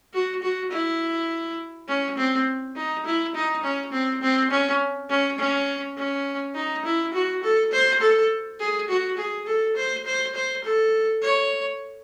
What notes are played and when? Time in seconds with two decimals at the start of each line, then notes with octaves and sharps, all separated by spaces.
0.14 F#4
0.42 F#4
0.71 E4
1.88 C#4
2.18 C4
2.76 D#4
3.06 E4
3.35 D#4
3.63 C#4
3.92 C4
4.22 C4
4.51 C#4
5.10 C#4
5.38 C#4
5.96 C#4
6.55 D#4
6.85 E4
7.14 F#4
7.43 A4
7.72 C5
8.01 A4
8.59 G#4
8.89 F#4
9.18 G#4
9.47 A4
9.76 C5
10.06 C5
10.35 C5
10.64 A4
11.22 C#5